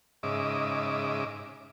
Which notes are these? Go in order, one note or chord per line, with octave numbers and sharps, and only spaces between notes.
G#2 C#3 D#5 E5 D6